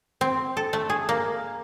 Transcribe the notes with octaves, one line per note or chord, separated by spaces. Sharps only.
C4
A4
A3
G#4
A#3